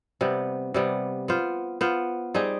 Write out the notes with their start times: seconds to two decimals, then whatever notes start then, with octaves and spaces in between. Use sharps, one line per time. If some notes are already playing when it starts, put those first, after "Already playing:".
0.21 C3 G3 B3
0.74 C3 G3 B3
1.28 B3 F4 C5
1.81 B3 F4 C5
2.34 G3 C4 D#4 G#4